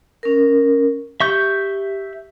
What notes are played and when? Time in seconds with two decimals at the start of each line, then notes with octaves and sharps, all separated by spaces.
0.23 C#4 A#4
1.20 G4 E5 C#6 G6